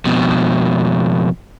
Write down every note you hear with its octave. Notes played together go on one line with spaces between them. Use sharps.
F2 B2